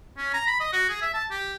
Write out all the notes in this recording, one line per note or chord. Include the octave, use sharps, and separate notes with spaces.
C#4
A#5
B5
D#5
F#4
G#4
E5
A5
G4